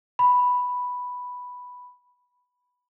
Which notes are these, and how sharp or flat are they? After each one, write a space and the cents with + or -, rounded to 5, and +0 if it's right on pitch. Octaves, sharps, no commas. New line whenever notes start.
B5 +0